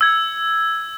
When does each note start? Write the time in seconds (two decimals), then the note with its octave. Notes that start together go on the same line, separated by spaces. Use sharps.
0.01 E6 G#6